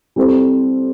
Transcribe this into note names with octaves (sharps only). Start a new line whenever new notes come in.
G3 C4 E4 A4 C5